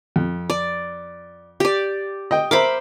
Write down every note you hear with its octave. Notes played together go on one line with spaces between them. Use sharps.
F2
D5
G4 D5
D#5 G5
A#4 C5 E5 B5 D6